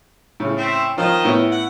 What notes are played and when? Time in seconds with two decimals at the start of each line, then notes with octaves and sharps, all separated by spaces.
0.40 A2 C#3
0.58 C4 E5
0.98 D#3 F3 F4 D#5
1.25 A2 B3 E4
1.52 F#5